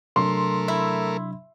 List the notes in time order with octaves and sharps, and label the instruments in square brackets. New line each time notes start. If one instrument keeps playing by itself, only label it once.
[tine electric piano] C3 F#3 D4 [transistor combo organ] A3 A#4 [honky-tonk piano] C6
[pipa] E4